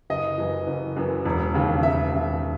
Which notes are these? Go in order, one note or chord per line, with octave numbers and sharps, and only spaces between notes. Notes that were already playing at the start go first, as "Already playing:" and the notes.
F#1 D#5
F#2 E3
F#1
F#2 E3
E1
D#2 C#3
E1 E5
D#2 C#3